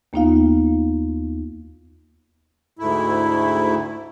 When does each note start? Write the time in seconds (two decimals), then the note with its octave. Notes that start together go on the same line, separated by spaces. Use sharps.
0.13 D#2 A#3 B3 D#4 F4 F5
2.79 D2 G#2 A3 E4